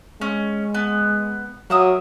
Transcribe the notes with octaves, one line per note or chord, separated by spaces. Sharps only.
G#3 C#4
B3
F#3 A#3 E5 D#6